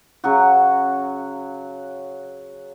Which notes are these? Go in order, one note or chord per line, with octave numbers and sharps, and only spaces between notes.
C#3 F#3 F#4